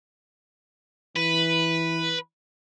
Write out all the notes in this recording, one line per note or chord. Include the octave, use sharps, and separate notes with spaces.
E3 B4